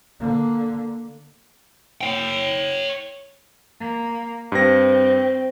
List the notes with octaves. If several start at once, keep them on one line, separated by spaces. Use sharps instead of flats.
D3 A#3
C#5 G5
A#3
G2 C4 A#6